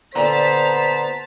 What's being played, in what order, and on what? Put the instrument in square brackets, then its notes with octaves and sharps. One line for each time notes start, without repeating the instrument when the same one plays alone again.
[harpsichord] A#2 D3 [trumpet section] B3 C5 [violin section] A5 B6 [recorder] A#5